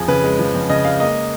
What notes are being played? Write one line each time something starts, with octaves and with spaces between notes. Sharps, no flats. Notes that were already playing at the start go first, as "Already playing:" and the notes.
Already playing: F2 F3 G#4
C#3 B4
G#3
F3
F2
C#3 D#5
G#3 F5
A#3 D#5